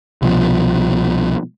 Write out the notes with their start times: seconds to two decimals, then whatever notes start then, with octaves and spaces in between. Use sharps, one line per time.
0.22 C2 B2 F3